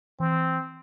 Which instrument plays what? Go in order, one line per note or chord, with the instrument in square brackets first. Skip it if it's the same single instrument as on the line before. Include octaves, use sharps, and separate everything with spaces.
[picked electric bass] E3 [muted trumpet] C4